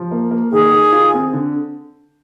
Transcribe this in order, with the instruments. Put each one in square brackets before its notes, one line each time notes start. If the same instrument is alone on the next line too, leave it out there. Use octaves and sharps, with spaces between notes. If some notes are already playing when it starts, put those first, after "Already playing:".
Already playing: [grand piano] F3
A#3
A#3
[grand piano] D#3 [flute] G#4
[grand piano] D#3
F4
C4
D3